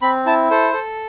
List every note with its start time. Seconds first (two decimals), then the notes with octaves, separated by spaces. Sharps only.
0.02 C4 B5
0.26 E4 A5
0.51 A4 C5
0.73 A4